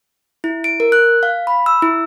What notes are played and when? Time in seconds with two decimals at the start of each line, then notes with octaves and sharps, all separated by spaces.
0.44 E4
0.64 D7
0.80 A#4
0.92 F#6
1.23 F5
1.47 B5
1.66 E6
1.82 E4